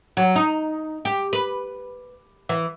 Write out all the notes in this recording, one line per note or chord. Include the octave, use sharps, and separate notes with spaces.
F#3
D#4
G4
B4
E3